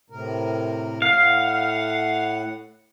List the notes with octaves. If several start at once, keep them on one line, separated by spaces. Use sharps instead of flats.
A2 C3 A#4
A2 F5 F#5